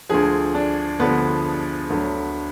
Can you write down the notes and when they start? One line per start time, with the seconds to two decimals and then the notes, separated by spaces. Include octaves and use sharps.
0.09 D2 D3 F3 G#4
0.55 D4
0.99 D2 D3 F3 B3
1.90 D2 D3 F#3